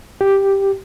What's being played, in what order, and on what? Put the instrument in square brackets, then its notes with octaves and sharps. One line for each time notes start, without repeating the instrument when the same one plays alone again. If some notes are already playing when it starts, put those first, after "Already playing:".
[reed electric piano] G4